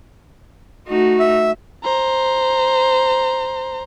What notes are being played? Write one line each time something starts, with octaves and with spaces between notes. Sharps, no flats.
A3 D#4 F#4
E5
C5 A#5